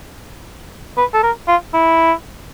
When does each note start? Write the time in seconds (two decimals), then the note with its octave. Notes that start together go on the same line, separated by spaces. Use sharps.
0.97 B4
1.14 A4
1.23 A#4
1.48 F4
1.74 E4